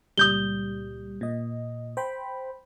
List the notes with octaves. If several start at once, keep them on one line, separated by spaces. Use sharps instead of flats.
C#2 A#2 G3 D#6 G6 G7
A#2 D#5
C5 G5 B5